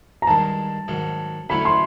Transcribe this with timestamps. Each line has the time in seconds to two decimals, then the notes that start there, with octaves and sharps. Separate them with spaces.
0.22 A#5
0.27 G2 D#3 G#3 A5
0.88 G#2 D#3 F#3
1.50 D3 F#3 A3 C#4 E4 B5
1.65 C6